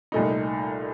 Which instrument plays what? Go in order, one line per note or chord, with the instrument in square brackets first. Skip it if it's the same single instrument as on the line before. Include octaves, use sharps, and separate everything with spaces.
[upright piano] C2 A#2 A3 D#4